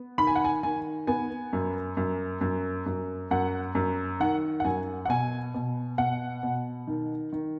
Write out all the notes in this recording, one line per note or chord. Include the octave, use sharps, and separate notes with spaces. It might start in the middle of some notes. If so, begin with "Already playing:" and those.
Already playing: B3
D#3 B5
G#5
F#5
G#5
D#3 G#5
B3 G#5
F#2
F#2
F#2
F#2
F#2 F#5
F#2
D#3 F#5
F#5
F#2 G#5
F#5
B2 G#5
B2
B2 F#5
B2
D#3
D#3